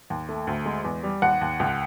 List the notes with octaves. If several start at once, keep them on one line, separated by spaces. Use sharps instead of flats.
D#2
A3
D2
G#3
E2
G3
D#2 F#5
D#2
C#2